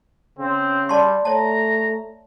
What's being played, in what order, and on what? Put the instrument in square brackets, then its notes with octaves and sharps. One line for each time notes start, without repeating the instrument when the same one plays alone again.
[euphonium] C#3 [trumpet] C4
[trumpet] G3 [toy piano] D5 A5 C6
[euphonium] A3 [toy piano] C#5 A5 [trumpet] A#5